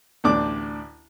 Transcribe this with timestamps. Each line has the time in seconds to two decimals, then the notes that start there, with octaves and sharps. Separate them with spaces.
0.24 A1 D2 D4 D6